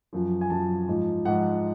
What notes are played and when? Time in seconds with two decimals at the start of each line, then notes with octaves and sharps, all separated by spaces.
0.13 F#2 F3
0.41 G#5
0.50 F#2 F3 A5
0.88 G#2 F3
1.25 G#2 F3 F#5